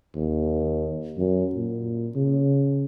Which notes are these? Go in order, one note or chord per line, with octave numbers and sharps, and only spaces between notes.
D#2
F#2
A#2
C#3